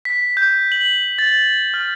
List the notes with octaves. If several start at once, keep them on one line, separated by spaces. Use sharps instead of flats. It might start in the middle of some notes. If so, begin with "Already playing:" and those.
B6
G6
F#7
A6
F6